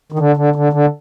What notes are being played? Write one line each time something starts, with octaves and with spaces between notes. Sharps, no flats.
D#3
D3
D3
D3
D3